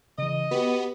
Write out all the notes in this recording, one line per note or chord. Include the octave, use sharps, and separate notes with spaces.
C#3 E3 D#5
B3 F#4 G4